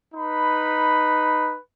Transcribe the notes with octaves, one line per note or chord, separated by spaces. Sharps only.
D#4 B4 B5